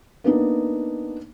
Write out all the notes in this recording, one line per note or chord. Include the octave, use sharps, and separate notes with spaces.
A#3 B3 D4 D#4